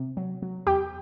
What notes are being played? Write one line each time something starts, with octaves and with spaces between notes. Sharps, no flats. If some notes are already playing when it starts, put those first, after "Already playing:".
Already playing: C3
F#3
F#3
E2 G4 G5